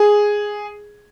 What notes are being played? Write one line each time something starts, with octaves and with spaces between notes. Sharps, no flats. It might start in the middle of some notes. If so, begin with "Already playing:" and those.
Already playing: G#4